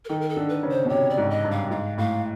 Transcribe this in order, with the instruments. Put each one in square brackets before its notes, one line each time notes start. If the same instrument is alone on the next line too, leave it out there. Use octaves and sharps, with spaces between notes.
[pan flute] A#4
[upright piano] D#3 [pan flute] A4
[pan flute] A#4
A4
[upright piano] D3
[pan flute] B4
[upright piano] C#3
[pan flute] C5
[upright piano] B2
[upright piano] C3 [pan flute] C#5
[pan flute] D5
[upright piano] G#2
[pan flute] D#5
[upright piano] G2
[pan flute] F5
[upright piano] G#2 [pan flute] F5
[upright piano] A2 [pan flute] F5